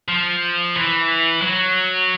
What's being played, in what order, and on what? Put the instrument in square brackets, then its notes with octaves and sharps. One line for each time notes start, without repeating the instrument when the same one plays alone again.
[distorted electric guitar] F3
E3
F#3